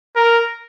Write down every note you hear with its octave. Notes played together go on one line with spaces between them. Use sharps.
A#4